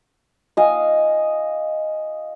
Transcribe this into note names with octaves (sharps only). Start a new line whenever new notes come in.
D#5 F5 G#5